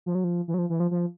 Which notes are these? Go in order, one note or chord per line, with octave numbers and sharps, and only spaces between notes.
F3
F#3
F3
E3
F#3
F3
E3
F3
F3